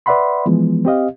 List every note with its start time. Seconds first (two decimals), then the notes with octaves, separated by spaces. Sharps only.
0.06 B4 D5 E5 F#5 B5 C6
0.46 E3 F3 G#3 B3
0.85 C4 G4 D#5 F5